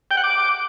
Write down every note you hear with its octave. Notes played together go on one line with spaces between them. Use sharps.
G5
F#5
D6